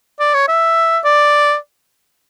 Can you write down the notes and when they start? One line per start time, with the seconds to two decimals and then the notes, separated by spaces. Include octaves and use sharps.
0.19 D5
0.34 C#5
0.48 E5
1.04 D5